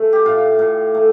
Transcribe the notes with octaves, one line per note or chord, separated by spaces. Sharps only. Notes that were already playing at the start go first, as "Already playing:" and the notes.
Already playing: A3
G4
A2 F4
A2
A3